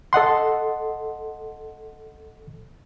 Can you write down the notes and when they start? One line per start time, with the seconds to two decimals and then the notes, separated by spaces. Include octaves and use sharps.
0.13 A4 D#5 F#5 C6